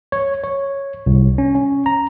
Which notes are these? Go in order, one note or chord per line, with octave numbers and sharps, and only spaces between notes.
C#5
C#5
C2
C#4
C#4
A#5